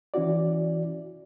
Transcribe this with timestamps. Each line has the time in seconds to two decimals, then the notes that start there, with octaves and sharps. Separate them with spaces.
0.14 E3 C#4 E4 F#4 D5